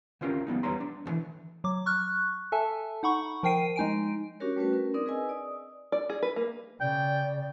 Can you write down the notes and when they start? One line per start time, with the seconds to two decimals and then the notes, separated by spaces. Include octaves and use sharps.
0.21 D3 C4 C#4 F4 G4 A#4
0.47 F3 G3 B3 D#4
0.63 E2 G3 B3 C#5 A#5 C6
0.80 D4
1.06 D2 D3 E3
1.64 F#3 D6
1.86 C#6 F6 F#6
2.52 A4 E5 G#5 A5
3.03 D#4 F#5 B5 C#6
3.43 F3 A#4 G5 C7 D#7
3.76 G#3 D#4 G#5 D7
4.40 C#4 D4 F#4 G4 A#4 C#5
4.56 G3 A3 C#4 F#4 B4
4.73 C#4 A#4
4.94 C4 D4 D#4 A#4 D5 D#6
5.06 G#4 B4 D#5 G#5 E6
5.29 D5 D#6
5.92 D5
6.10 G#4
6.22 B4
6.36 A#3
6.81 C#3 D5 G5